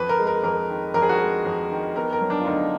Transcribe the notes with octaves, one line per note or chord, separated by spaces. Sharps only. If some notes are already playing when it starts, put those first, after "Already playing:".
Already playing: F2 B4
A#4
G#3
A#4
F2 A#4
D#3
F2 A#4
G#4
F#4
G#3 G#4
F2
D#3
B3 A#4
A#4
F#3
D4
F4
D2 D#4